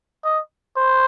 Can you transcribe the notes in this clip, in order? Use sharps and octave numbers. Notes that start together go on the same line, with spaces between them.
D#5
C5